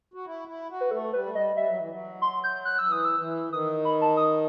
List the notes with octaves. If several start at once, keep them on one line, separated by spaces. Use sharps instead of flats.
F#4
E4
E4
F#4
B4
A3 A4
G3 B4
A3
G3 D#5
G3 E5
F#3
E3
F#3
C6
G6
F#6
E6
E3
D#6
E6
E3
D#3 D#6
B5
A5
D#6